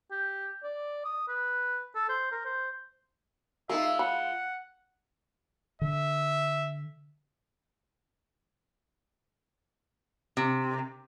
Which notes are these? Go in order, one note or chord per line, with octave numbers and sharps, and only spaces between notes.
G4
D5
D#6
B4
A4
C5
A#4
C5
G#3 D#4 F4 A#4 E5
F#5 B5
D3 E5
C3